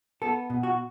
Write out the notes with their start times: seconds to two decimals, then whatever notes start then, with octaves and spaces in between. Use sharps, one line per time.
0.22 B3 A4
0.50 B2
0.63 F#4